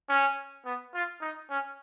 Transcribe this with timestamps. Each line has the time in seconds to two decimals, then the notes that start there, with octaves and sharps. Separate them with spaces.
0.09 C#4
0.65 B3
0.94 F4
1.21 D#4
1.50 C#4